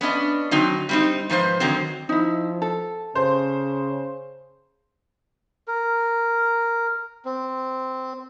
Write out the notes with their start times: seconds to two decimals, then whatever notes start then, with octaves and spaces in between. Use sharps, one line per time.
0.01 B3 C#4 D4 D#5
0.51 D3 F#3 C4 D#4
0.89 G3 C4 D#4
1.30 G#2 F3 B4 C5
1.60 D3 D#3 F#3 C4
2.09 F3 D#4 E4
2.62 A4
3.15 C#3 C5
5.68 A#4
7.25 C4